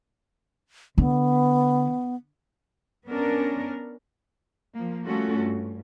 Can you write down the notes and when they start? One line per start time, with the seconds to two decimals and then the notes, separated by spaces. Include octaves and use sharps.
0.98 D3 B3
3.07 B3 C#4 D4 A#4
4.75 F3 A#3
5.05 G3 A3 C#4 F4 F#4 A4
5.37 G2